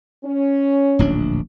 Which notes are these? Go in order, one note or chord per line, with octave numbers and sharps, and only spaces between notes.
C#4
D1 A#1 D4